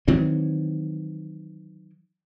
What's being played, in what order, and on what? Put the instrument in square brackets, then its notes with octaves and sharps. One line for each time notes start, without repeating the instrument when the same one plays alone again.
[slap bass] D#3 E3 F#3 C4